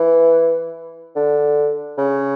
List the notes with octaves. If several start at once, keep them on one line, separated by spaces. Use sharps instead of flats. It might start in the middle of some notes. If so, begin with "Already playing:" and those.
Already playing: E3
D3
C#3